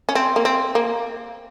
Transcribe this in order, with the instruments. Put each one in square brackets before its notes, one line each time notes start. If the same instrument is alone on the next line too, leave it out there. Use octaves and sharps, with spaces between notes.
[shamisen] C#4
C4
A#3
C4
A#3